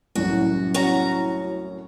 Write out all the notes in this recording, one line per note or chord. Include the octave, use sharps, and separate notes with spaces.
C2 F#2 A2 F#4
C#4 F#4 A#5